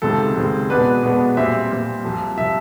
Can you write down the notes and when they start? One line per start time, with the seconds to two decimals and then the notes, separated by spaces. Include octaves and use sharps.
0.02 C#2 C3 D#3 G#3 C4 A4
0.35 C#2 C3 D#3 G#3 C4
0.70 B2 G#3 B3 D4 B4
1.03 B2 G#3 B3 D4
1.37 A#2 G3 C4 E5
1.70 A#2 G3 C4
2.04 C2 C3 F3
2.37 C3 F3 E5